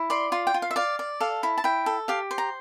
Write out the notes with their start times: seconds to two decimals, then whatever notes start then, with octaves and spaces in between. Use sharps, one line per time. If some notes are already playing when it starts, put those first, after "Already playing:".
Already playing: E4
0.10 D5 C6
0.32 F4 C6
0.47 G5
0.54 F4
0.62 F5
0.71 E5
0.76 D5 F5
0.99 D5
1.20 A4 F5
1.43 E4
1.58 A5
1.64 E4 G5
1.86 A4
2.08 G4 F5
2.31 C5
2.38 A#5